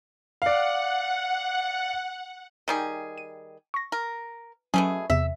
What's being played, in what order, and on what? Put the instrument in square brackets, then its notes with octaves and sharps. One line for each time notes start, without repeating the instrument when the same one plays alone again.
[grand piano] D5 F5 [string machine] F#5
[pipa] D#3 G3 G#4
[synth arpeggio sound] D#7
C#6 A#6
[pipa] A#4
[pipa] B2 A3 G#4 [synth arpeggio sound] F#3 C#4
[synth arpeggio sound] E2 C3 [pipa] E5